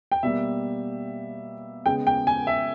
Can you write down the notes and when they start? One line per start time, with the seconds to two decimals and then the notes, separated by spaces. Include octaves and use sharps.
0.12 G5
0.23 B2 G3 A#3 E5
1.86 C#3 G#3 B3 G5
2.07 G5
2.27 G#5
2.47 E5